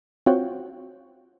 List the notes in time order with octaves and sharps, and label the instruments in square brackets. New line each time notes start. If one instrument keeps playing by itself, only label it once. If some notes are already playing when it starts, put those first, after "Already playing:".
[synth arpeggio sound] C4 F4 F#4 C#5 F#5 G5